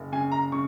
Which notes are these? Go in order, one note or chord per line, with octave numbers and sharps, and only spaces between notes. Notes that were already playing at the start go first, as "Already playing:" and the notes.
Already playing: F#1
C#3 G#5
A#5
C#3 C#6